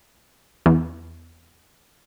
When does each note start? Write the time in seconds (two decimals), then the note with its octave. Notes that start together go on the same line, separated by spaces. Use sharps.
0.66 E2